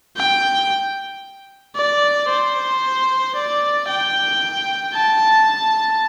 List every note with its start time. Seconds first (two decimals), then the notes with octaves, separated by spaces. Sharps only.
0.17 G5
1.75 D5
2.29 C5
3.35 D5
3.89 G5
4.94 A5